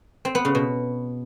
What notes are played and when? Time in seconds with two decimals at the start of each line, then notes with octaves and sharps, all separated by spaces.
0.25 C4
0.35 B3
0.45 C#3
0.55 B2